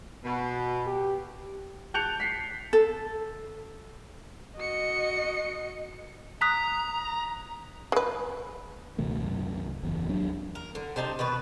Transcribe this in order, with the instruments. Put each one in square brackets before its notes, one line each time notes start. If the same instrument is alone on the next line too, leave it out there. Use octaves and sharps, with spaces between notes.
[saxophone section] B2
[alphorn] G4
[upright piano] A5 F#6 G6 C#7 F7
B6 C7
[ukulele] A4
[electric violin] F#4 C#7 [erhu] D#5
[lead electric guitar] A#5 [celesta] D#6 F#6 B6
[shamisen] G#3 B4
[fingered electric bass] C#2 B2 D#3 A3
C2 F#2
F#1 E2
D#2 F#3 D4
[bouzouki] A#4
D3
C3 D4 D#4 A5
B2 D#3 B4